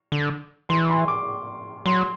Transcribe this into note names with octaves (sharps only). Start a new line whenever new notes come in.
D3
E3 C6
C6
D6
F#3 C6